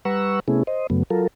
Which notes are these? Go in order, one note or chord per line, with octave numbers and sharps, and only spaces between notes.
G3 B4 F#5 A#5 C#6 E6
C3 A3 B3 C#4 E4 G#4
C5 D#5
F#2 C#3 F#3 A3 B3
F#3 F4 A4 A#4